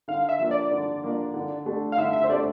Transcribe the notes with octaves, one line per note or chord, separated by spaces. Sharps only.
D3 F5
E5
F3 A#3 D4
D5
D3
F3 A#3 D4
D3
A3 D4 A4
F5
D3 E5
E5
C5
A3 D4 A4 D5